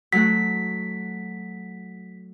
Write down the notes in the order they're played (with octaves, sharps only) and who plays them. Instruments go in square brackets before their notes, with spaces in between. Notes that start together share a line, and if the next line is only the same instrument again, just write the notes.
[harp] F#3 A3 F#4 [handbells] B6